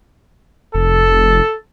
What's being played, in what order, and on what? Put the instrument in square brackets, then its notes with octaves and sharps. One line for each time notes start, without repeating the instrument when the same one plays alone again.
[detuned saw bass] F1 [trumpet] A4